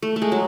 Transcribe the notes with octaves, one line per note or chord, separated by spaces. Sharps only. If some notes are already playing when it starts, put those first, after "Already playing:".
A3
A3
G#3
F#3